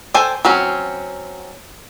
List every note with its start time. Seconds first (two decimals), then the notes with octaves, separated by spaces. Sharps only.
0.14 A4 C5 G5 G#5
0.45 F#3 C4 C#4